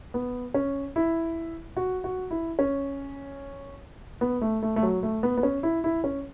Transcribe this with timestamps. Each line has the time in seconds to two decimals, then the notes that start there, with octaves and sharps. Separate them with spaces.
0.14 B3
0.54 C#4
0.96 E4
1.77 F#4
2.04 F#4
2.31 E4
2.59 C#4
4.21 B3
4.41 A3
4.63 A3
4.76 A3
4.83 F#3
5.03 A3
5.23 B3
5.37 B3
5.43 C#4
5.63 E4
5.84 E4
6.04 C#4